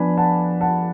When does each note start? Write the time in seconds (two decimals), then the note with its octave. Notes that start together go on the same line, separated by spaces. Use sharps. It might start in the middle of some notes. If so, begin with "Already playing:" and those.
Already playing: F3 B3 D4 G#5 B5
0.17 F#5 A5
0.61 F#5 A5